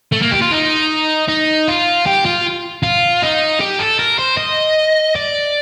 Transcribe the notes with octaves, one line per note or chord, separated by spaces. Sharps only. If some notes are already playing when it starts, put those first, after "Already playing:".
A3
A#3
G4
F4
D#4
D#4
F4
G4
F4
F4
D#4
G4
A4
A#4
C5
D#5
D5